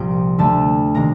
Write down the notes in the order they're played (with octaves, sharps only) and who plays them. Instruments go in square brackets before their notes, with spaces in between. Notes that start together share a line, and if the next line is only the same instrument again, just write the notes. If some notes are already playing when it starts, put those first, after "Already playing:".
Already playing: [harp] C2 A#2 F3 A#3 G5
D2 D3 A3 A5
C3 D#3 A#3 A#5